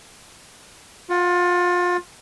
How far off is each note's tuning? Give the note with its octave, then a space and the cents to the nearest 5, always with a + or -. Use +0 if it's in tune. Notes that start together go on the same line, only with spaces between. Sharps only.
F4 +25 F#5 +0